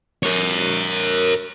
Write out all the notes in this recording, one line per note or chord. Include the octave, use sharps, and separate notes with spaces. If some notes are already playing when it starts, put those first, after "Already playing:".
A#4 C#5